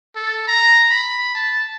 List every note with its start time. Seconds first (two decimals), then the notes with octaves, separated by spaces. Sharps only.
0.16 A4
0.47 A#5
0.90 B5
1.35 A5